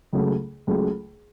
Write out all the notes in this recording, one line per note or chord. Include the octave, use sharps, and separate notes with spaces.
C#2 C#3 F#3 A3
C#2 C#3 F#3 A3